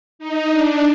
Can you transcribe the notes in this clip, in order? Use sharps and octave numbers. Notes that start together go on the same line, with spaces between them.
D#4
D4